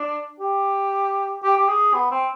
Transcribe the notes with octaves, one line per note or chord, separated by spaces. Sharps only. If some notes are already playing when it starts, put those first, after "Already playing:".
Already playing: D4
G4
G4
G4
G#4
B3
C4